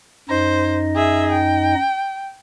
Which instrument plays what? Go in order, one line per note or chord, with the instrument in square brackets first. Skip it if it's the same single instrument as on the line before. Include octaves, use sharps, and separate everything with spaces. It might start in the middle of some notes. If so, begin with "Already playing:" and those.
[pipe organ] F#2 D#4 D#5 [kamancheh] C5
[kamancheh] G#4 E5
G5